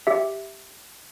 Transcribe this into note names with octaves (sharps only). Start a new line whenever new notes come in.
G4 E5